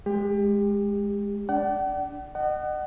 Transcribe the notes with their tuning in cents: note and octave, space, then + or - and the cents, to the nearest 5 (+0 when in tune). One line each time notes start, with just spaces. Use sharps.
G#3 +0 G4 +30
D4 -10 D5 +0 F#5 +45
D#5 -35 F#5 +25